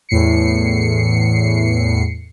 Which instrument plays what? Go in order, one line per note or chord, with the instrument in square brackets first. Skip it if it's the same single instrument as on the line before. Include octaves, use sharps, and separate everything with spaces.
[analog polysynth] E2 A2 C7 C#7